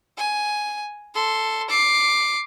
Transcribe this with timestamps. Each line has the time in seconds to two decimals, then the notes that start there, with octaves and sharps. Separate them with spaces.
0.18 G#5
1.15 A4 C6
1.69 D6 C7